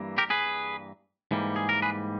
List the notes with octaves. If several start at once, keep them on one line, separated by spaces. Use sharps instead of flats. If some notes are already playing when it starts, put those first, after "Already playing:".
Already playing: G2 E3 G3 A#3
G4 A#4
G#4 B4
G#2 E3 G3 A#3
G#4
A#4
G#4 B4